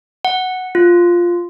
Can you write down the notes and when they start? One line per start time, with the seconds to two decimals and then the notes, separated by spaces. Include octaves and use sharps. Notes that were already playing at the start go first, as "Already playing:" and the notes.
0.25 F#5
0.75 F4